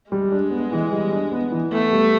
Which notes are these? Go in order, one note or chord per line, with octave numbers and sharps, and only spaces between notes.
G3 G#3
D4
B3
E3
G3
D4
B3
E3
A3 B3
G3